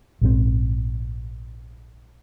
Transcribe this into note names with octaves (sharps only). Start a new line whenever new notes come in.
A#1 G#2 F3 C4